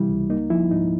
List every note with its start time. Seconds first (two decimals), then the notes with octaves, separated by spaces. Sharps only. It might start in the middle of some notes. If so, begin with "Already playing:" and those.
Already playing: C3 E3 G3 E4
0.09 C#2
0.30 A#3 D#4
0.50 F3 E4
0.71 G#2 D#4